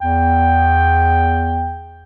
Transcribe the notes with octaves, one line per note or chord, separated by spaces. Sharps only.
E2 G5